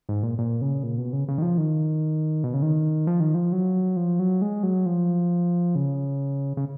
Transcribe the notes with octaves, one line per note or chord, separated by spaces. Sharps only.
G#2
A#2
A#2
C#3
A#2
B2
C#3
C#3
D#3
F3
D#3
B2
C#3
D#3
F3
D#3
F3
F#3
F3
F#3
G#3
F#3
F3
C#3
C#3